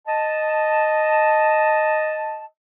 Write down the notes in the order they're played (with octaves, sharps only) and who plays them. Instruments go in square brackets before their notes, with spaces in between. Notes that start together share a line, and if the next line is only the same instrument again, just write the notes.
[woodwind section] D#5 A5